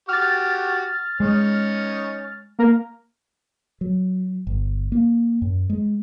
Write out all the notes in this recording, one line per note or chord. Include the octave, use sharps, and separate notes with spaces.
F#4 G4 F6 A6
G#3 C#4 D#4
A#3 A#4
F#3
G1
A#3
F#2
G#3